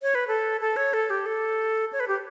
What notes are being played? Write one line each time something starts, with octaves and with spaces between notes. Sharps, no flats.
C#5
B4
A4
A4
C#5
A4
G4
A4
C#5
B4
G4